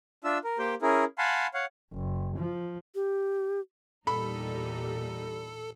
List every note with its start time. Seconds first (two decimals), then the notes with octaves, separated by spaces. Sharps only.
0.24 D4 F4 E5 E6
0.44 A#4
0.59 A#3 G4 C5 G5
0.82 C#4 E4 G#4 A#4
1.18 F5 F#5 G#5 A5 B5 C6
1.54 C#5 F5 F#5
1.93 F#1
2.36 F3
2.95 G4
4.07 E2 A#2 G3 D#4 A4 B5